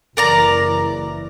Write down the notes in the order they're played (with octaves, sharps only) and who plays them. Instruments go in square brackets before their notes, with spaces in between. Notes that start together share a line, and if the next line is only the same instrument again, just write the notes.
[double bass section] F#1 E3 [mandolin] A#4 D5 A#5